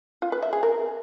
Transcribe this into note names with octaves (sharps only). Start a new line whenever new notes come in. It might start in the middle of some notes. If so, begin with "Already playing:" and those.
F4
B4
E5
G#4
A#4